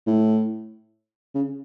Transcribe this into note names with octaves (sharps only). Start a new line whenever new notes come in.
A2
C#3